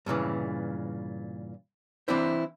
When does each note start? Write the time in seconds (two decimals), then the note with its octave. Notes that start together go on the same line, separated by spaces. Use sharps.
0.06 G2 A#2 C#3 E3
2.08 E3 C4 D4 E4 C5